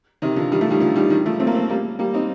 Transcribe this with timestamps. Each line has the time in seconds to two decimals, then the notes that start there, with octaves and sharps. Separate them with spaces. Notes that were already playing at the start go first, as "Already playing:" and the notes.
0.22 C3 D#3
0.36 D3 F3
0.52 D#3 G3
0.61 F3 A3
0.70 D#3 G3
0.80 D3 F3
0.96 D#3 G3
1.10 D#3 G3
1.26 F3 A3
1.40 A3 C4
1.47 A#3
1.55 A3 C4
1.69 G3 A#3
1.99 G3 A#3
2.14 C4 D#4